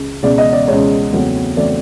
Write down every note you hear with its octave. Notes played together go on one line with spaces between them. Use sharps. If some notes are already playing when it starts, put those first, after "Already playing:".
Already playing: C#2
C#2 B2 G#3 D5
D#5
D5
C#2 B2 G#3 C#5
E2 C#3 F#3 A3 C4
C#3 F#3 A3 C4 D5